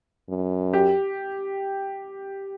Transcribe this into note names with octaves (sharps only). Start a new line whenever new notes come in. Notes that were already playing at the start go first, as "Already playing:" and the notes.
F#2
G4